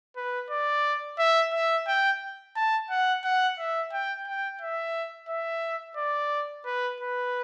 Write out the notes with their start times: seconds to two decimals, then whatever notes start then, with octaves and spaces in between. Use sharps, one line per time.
0.16 B4
0.50 D5
1.19 E5
1.54 E5
1.87 G5
2.56 A5
2.90 F#5
3.24 F#5
3.59 E5
3.93 G5
4.26 G5
4.61 E5
5.29 E5
5.97 D5
6.66 B4
7.00 B4